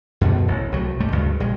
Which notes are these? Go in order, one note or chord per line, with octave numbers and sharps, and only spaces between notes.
F#2 B2 D3 F3
A1
C2 F#3 G#3 A3
D2 G#2 G3 A3
D2 G2 C#3
A#1 G3 G#3